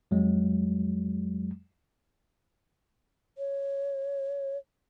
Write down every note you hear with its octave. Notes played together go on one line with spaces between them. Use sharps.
F2 F#3 G#3
C#5